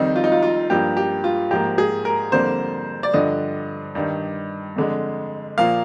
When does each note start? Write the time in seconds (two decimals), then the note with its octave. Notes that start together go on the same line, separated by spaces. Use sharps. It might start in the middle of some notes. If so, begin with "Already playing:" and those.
Already playing: F2 D#3 G3 C4 D#4
0.16 F4
0.24 D#4
0.32 F4
0.43 F4
0.70 G2 F3 A#3 G4
0.97 G4
1.24 F4
1.51 G#2 F3 A#3 G4
1.78 G#4
2.05 A#4
2.32 F2 D3 G3 A#3 C5
3.03 D5
3.14 G2 D3 F3 D#5
3.95 G2 D#3 G3
4.76 F2 D3 G#3
5.58 A#2 F3 A#3 F5